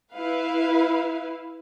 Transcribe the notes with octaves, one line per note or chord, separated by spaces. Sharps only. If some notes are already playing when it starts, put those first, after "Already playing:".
E4 B4 F5